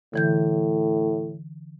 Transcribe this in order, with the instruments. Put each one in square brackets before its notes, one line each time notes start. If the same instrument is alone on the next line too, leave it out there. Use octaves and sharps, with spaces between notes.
[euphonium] A2 [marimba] D3 E3 G6